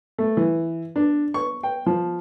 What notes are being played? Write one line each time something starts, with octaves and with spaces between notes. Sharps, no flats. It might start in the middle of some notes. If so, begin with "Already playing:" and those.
A3
E3
D4
C#6
G5
F3